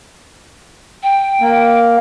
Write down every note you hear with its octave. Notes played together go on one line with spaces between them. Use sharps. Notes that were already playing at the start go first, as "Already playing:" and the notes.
G5
A#3